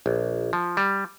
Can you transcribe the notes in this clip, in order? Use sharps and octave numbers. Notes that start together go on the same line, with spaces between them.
A#1
F3
G3